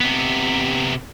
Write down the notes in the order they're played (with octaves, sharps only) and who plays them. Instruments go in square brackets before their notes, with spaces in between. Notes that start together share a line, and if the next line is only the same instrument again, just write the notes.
[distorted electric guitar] C3 B3